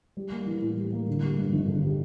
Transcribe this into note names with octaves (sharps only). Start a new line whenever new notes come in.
G3
A#3
E3
A2
G3
A#3
D3
G3
G2
G#1
D3
G3